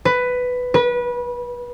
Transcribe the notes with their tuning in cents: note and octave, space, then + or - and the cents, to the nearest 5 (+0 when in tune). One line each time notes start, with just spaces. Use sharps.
B4 +10
B4 -25